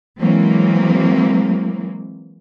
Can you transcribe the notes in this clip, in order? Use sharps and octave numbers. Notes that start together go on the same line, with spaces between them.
E3 F#3 G#3 A#3 C4